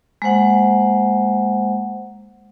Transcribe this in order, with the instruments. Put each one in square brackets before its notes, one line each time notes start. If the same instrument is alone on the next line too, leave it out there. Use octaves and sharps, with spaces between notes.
[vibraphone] G#3 A#3 C5 F#5